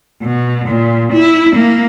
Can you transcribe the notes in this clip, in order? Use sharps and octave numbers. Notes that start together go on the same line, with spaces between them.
B2
A#2
E4
A#3